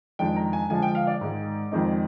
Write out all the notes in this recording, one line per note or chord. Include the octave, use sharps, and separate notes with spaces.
F2 D#3 G#3 D4 G5
A#5
G#5
D3 F3 G#3 D4 G#5
G5
F5
D5
G#2 D#3 G#3
F2 D#3 G#3 C4 D#4